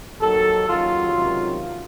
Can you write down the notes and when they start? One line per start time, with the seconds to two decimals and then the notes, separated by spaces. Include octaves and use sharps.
0.19 D#2 D#3 F#3 A4
0.67 D#2 C#3 F#3 F4
1.14 C#2 C3 D#3 F#3